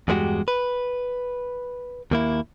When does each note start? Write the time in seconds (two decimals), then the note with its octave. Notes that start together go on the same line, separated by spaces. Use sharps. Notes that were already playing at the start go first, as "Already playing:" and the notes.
0.08 E2 G2 G#3 D#4 F#4 G4
0.48 B4
2.11 D#2 A#3 E4